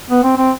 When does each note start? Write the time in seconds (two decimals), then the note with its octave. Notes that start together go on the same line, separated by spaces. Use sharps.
0.10 B3
0.23 C4
0.37 C4